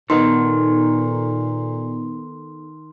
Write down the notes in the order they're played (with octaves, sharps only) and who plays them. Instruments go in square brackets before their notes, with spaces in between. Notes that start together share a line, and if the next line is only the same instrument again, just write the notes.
[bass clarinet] A#2 [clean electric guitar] D#3 [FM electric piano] B3 D#4 A4 [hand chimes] C6